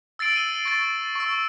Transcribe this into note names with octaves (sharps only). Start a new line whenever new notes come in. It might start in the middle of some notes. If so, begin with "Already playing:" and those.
E6 A6 C7 D7 F#7
D#7 G7
C#6 A6
C#6 E6